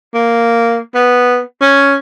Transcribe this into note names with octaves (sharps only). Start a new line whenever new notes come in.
A#3
B3
C#4